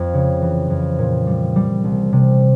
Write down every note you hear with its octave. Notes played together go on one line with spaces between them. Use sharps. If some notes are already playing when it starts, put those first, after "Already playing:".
Already playing: F2 F3
C#3
E3
F2
A#2
G3
G3
C2
C3